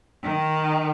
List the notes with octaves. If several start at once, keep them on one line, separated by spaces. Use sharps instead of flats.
D#3